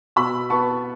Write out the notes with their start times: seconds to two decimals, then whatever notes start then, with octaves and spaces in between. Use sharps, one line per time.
0.16 B2 B5 E6
0.50 B3 A5 C#6